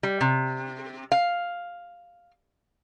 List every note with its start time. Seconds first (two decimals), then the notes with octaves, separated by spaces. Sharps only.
0.03 G3
0.21 C3
1.12 F5